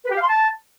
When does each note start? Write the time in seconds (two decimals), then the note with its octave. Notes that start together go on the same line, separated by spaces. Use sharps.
0.05 B4
0.10 G4
0.16 F5
0.22 C6
0.28 A5